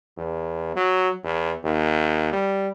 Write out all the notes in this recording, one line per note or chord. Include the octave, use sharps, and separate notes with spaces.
E2
F#3
E2
D#2
G3